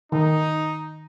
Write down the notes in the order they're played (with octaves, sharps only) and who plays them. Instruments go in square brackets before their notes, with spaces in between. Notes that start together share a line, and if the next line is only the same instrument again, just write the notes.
[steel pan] D#3 [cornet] D#4